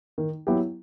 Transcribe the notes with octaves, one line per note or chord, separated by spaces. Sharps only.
D#3
F#3 B3 E4 G4